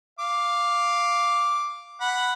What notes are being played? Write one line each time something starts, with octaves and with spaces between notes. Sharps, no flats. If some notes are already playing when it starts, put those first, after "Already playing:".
F5 D6
F#5 B5